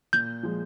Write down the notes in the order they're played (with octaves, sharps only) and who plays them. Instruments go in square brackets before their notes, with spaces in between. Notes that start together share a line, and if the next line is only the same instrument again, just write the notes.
[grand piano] A#2 [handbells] G6
[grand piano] F3 G#3